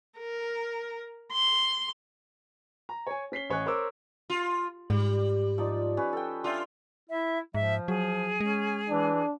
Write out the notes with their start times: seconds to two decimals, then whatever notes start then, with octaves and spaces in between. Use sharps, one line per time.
0.18 A#4
1.32 C6
2.89 A#5
3.07 C#5 G#5
3.32 C#4 B6 C7 G7
3.50 A1 C#5 D#5 G#5 F#6
3.66 A#4 C5 C#5 D6 E6
4.30 F4
4.90 G#2 G3
5.58 F3 D#4 D5
5.97 C#4 B4
6.13 A4 G5
6.44 D4 F4 E5 G5
7.10 E4 E5
7.54 G#2 F3 E5
7.88 F#3 G#4
8.40 G#3 C#4
8.90 E3 D4